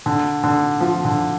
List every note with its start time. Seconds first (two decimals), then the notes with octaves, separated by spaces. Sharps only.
0.06 D3
0.44 D3
0.81 F3
1.05 D3